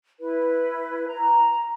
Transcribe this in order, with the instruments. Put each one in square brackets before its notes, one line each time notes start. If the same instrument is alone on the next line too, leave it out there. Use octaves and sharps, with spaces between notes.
[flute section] E4 B4
A#5